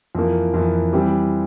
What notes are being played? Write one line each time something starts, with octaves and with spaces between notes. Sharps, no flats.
F2 E3 A#3
F2 E3 A#3
E3 G3 C4 G4